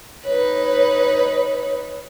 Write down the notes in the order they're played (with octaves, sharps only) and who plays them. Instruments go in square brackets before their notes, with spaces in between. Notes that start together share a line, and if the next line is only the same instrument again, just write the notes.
[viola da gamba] D#4 B4 [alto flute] C#5